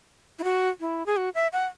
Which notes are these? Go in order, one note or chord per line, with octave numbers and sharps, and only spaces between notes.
E4
F#4
E4
G#4
F#4
E5
F#5